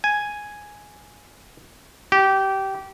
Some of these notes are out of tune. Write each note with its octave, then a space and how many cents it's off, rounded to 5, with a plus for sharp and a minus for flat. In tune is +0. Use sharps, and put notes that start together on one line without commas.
G#5 +0
G4 -20